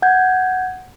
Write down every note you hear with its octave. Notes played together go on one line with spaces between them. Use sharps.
F#5 G6 G#6